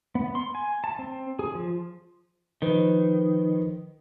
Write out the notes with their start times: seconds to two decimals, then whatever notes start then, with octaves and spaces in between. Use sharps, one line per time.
0.15 B3
0.35 C6
0.55 G#5
0.84 A5
0.99 C4
1.39 G#4
1.55 F3
2.62 D#3 F3 B4 C5